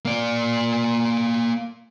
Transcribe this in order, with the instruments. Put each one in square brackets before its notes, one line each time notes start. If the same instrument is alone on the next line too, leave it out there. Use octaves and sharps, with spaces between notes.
[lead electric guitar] A#3 D5